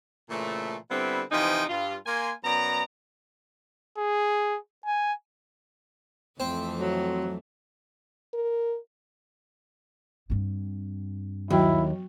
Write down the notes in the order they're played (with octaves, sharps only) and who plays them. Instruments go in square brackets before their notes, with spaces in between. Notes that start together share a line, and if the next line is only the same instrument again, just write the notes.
[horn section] A#2 C#3 E3 A3
D3 G3 B3 C4 E4
C3 E3 F3 D#4 G5 G#5
G2 F4
A#3 G#5 C6
F#2 B3 D5 A#5
[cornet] G#4
G#5
[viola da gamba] F2 E3 A3 [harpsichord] C4
[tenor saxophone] F#3
[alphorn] A#4
[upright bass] G2 C4
[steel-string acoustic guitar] D#2 [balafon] F#3 F#4 G5 [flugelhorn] E4